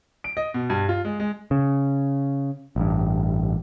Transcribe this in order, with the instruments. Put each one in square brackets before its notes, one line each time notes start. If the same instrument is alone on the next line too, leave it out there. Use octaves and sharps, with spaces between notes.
[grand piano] D7
D#5
B2
G2
F4
G#3
G#3
[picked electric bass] C#3
A1 G2